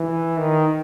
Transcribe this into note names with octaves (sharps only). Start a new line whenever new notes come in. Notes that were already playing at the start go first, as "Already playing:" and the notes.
Already playing: E3
D#3